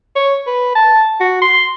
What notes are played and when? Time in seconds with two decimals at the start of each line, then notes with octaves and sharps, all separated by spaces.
0.16 C#5
0.47 B4
0.75 A5
1.20 F#4
1.42 C6